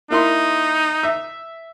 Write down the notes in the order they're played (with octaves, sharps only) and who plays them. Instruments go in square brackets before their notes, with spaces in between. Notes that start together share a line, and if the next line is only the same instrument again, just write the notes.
[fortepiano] A#3 E4 C6 [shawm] D#4
[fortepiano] E5